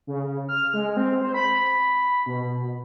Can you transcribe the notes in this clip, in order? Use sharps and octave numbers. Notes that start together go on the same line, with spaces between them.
C#3
F6
G#3
C4
C5
B5
B2